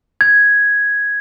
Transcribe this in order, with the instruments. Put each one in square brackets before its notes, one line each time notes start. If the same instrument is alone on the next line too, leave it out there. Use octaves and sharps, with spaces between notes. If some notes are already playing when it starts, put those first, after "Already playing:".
[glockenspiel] G#6